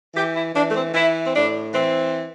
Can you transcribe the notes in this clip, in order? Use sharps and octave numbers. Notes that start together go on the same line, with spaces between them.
E3 G4
E4
E3 D4
A3
C4
E3 E4
C4
A2 D4
E3 C4